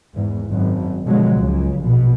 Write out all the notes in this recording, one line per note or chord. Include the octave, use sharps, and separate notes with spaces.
E2 G#2
G#1 F#2
B2 D3 F3 F#3 G#3
C#2 C#3
A#1 B2